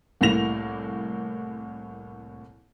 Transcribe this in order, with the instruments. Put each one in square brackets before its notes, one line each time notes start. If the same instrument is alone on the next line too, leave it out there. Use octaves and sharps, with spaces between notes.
[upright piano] C2 A2 E3 A#3 A#6 F7